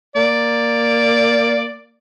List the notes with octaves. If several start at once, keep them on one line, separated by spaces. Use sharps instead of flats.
A#3 D5